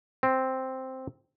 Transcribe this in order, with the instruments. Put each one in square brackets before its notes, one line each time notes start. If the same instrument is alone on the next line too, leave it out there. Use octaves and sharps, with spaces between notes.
[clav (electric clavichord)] C4